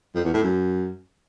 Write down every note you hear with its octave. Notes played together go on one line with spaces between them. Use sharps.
F2
E2
A2
F#2